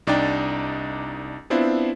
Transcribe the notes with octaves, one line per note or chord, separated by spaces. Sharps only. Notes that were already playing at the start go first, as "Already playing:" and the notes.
C2 D4 D#4 D5 G5 A6
B3 C4 D4 E4 F4 C5